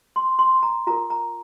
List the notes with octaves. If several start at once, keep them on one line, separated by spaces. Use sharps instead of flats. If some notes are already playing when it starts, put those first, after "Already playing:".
C6
C6
A#5
F4 A#4 A#5
A#5